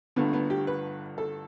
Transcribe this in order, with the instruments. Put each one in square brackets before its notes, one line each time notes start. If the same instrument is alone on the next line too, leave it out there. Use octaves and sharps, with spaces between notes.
[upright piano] G1 G2 D3 A3 [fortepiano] B3
[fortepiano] B3
G4
B4
A4